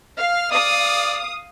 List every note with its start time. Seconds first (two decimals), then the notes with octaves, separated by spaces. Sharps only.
0.18 F5 F6
0.52 D5 F5 D#6